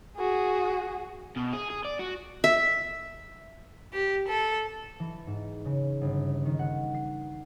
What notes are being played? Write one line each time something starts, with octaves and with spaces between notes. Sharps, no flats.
F#4 G#4
B2
G#4
G#4
D5
F#4
E5
G4
A4
E3
G#2
C#3
G1
D#3
F#5
C7